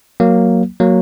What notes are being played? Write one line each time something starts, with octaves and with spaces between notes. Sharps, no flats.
F#3 A#3
F#3 A#3